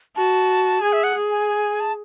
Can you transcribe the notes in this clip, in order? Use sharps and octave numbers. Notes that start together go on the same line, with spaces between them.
F#4 A5
G#4 G#5
E5
F#5
G#4
G#5
A5